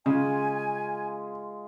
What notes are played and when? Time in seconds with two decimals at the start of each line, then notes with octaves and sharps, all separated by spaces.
0.06 C#3 G#3 F4 G#5